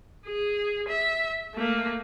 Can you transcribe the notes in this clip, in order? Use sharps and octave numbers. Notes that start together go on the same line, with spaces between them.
G#4
E5
A3 A#3